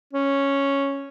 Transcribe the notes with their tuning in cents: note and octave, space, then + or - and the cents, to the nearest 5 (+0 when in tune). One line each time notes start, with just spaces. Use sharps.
C#4 +0